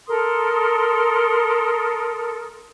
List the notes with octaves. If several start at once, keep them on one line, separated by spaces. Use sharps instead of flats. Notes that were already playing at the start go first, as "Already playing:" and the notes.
A4 A#4 C6 D#6